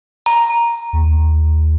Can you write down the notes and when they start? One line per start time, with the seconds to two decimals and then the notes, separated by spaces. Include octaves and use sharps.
0.26 A#5
0.93 D#2